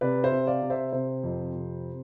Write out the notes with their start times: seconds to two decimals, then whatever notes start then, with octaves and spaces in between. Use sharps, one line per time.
0.01 C3 B4 D5
0.24 C5 E5
0.32 C3
0.47 D5 F5
0.62 C3
0.70 C5 E5
0.92 C3 C5
1.23 F2
1.54 C3